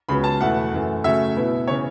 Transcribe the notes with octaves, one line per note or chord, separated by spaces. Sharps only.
C#2 C#3 F#3 B3 B5
A5
E2 B2 A3 E4 F#5
F#2 E3 A3
C#3 F#3 A3 C#4 E5
B2 B3 E4
C#3 E3 C#5